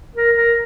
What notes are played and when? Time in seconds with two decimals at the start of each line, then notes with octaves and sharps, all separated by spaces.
0.16 A#4
0.37 A#4